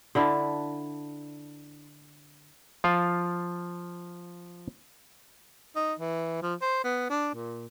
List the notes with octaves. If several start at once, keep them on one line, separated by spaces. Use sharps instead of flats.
D3 D4 E4 F5
F3 F4 F5
D#4
E3
F3
C5
B3
D4
A#2